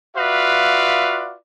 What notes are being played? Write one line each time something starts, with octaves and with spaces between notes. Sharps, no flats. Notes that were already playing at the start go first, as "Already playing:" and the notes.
F4 F#4 B4 D5 E5 F5